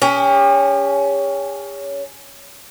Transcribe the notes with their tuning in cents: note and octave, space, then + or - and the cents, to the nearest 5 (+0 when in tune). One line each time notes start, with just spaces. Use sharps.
C#4 +20 G4 +45